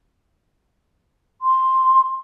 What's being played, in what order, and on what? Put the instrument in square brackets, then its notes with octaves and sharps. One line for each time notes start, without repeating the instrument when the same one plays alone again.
[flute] C6